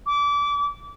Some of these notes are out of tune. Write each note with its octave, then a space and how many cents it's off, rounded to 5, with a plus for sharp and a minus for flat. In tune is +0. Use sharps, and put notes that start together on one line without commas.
D6 -25